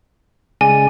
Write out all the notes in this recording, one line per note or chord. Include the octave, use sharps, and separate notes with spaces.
C#3 G#3 D5 G#5